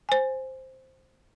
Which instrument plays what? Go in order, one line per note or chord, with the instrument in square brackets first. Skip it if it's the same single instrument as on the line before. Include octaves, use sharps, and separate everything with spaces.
[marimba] C5 G#5